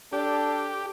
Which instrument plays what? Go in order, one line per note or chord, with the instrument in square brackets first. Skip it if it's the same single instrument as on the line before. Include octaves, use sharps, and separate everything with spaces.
[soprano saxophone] D4 [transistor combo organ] G4 [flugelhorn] A4